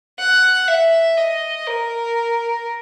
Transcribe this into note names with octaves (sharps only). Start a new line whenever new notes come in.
F#5
E5
D#5
A#4